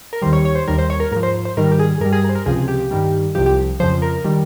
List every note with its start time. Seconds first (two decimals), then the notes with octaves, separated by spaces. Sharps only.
0.13 A#4
0.22 D#2 D#3 G3 C5
0.33 C#5
0.45 C#5
0.55 C5
0.68 D#2 D#3 G3 A#4
0.78 C5
0.90 C#5
1.00 A#4
1.11 G#2 A#4
1.16 F3
1.23 C5
1.45 C5
1.57 G#2 D#3 G3 A#4
1.72 G4
1.79 G#4
2.01 G2 A#4
2.05 G3
2.13 G#4
2.24 A#4
2.29 C5
2.35 A#4
2.46 C#2 C3 F3 G#4
2.68 G4
2.91 G2 D#3 G3
3.35 C2 C3 F3 G4
3.46 G4
3.80 F2 C#3 F3 C5
4.02 A#4
4.24 D#3 G3